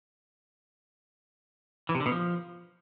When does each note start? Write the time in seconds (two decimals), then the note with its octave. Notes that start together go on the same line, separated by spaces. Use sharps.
1.89 E3
1.95 C3
2.00 D3
2.06 B2
2.11 F3